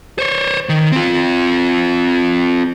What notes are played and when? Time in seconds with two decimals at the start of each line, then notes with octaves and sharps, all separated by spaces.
0.19 C5 C#5
0.69 D#3
0.92 C4 F4